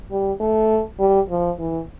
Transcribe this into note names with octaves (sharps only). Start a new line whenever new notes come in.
G3
A3
G3
F3
E3